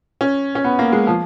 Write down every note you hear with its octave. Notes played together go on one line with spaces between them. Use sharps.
C#4
C#4
B3
A#3
G#3
F3